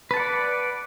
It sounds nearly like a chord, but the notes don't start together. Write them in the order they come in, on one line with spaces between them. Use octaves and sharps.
B4 A5 F#5 D5